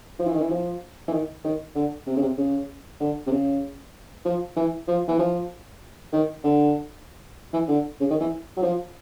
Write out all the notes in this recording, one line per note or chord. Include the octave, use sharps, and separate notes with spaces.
F3
E3
D#3
E3
F3
E3
D#3
D#3
D3
C3
C#3
C3
C#3
D3
C3
C#3
F3
E3
F3
E3
F3
D#3
D3
E3
D3
C#3
D#3
E3
F#3
F3